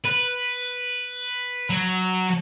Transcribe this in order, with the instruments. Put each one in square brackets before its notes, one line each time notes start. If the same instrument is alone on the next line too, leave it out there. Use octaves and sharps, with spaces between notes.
[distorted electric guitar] B4
F#3